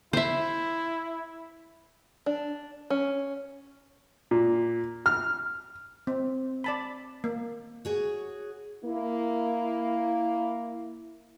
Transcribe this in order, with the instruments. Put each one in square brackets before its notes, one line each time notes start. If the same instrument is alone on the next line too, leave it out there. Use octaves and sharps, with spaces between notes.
[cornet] E4 [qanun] C5 E5
[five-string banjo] D4
C#4
[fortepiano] A#2
F6
[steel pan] C4
D5 A5 B5
A#3
[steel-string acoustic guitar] F#4 G#4 C#5
[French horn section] A#3 E4